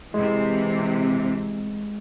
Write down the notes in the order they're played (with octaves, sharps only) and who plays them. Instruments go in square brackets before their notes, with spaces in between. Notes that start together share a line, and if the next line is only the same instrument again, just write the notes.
[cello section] C3 E3 [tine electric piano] G#3